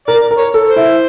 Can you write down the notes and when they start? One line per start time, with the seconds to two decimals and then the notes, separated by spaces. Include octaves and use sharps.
0.08 A#4 D5
0.31 A#4
0.38 C#5
0.54 A4
0.69 C5
0.76 E4